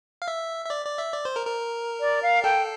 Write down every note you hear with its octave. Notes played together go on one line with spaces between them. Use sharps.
F5
E5
E5
D5
D5
E5
D5
C5
A#4
A#4
D5
F5
A4 G5